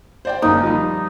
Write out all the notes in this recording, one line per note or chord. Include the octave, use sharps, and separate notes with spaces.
C5 D5 G5
F#1 A#3 D#4
F3 G3